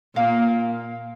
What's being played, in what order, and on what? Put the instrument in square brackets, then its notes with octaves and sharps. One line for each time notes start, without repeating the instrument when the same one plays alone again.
[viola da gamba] A#2 A#3 [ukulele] F5